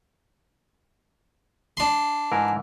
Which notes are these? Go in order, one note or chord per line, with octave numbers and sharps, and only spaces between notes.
D4 C6
G#2 E3 A#4